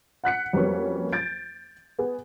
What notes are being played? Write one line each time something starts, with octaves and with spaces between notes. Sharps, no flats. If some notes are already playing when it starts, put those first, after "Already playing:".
F#5 F#6 B6 C#7
F2 F#3 G3 A#3 B3 C#4
G6 A6 D7
B3 G#4